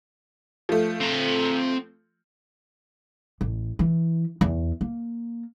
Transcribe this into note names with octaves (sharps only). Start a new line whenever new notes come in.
F3 A3
C4 A#5
A1
E3
E2
A#3